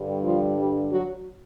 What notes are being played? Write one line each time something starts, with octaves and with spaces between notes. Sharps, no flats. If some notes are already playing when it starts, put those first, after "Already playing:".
Already playing: G2 D3 G3
F3 F4
G3 G4
F#3 F#4